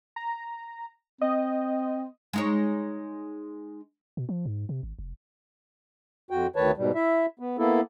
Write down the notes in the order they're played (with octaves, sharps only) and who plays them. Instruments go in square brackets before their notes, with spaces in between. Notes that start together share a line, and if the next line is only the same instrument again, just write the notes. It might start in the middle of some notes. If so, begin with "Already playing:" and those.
[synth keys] A#5
[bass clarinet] C4 [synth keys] D#5
[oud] G#3 D#4 C#5
[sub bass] B2
F3
G#2
C3
G#1
F1
[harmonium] F2 F#4 G5
D2 D#3 B4 C#5 A5
G#2 B2 G3
E4 E5
B3
A#3 B3 E4 A4